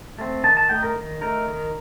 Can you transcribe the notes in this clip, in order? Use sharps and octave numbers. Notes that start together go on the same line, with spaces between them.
A3 C4
D#3 A5
A5
A3 D#4 G5
A#4
D#3
A3 D#4 A#4
D#3